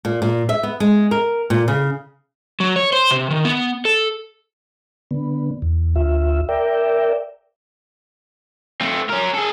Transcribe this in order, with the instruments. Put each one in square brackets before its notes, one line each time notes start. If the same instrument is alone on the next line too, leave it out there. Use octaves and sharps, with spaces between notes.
[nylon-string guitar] A#2
A#2
E5
B3
G#3
A#4
A#2
C#3
[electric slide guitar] F#3
C#5
C5
C3
D#3
B3
A4
[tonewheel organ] D3 B3
E2
D2 F4 E5
A#4 D5 E5 G5
[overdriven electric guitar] A3 C4
C#4 A#4
G#4 A4